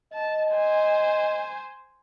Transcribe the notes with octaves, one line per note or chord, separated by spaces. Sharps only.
D#5 A5
C5 G#5